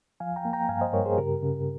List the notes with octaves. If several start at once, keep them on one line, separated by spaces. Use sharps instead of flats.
F3 F5 G#5
G5 A#5
A#3
G5 A#5
G2 F5 G#5
C5 D#5
G2 A#4 C#5
G#4 C5
C#3 G4 A#4
C#3